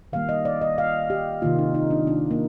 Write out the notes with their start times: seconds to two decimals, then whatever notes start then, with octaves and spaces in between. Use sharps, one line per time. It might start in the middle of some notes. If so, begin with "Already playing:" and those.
0.13 D#3 G3 A#3 F5
0.29 D#5
0.45 D5
0.61 D#5
0.78 F5
1.10 G4
1.42 C3 D#3 A#3 F4
1.59 D#4
1.75 D#4
1.91 D4
2.07 D4
2.31 A#3